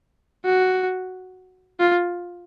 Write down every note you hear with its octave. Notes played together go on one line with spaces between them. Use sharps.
F#4
F4